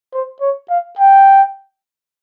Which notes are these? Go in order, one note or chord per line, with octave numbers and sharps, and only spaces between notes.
C5
C#5
F5
G5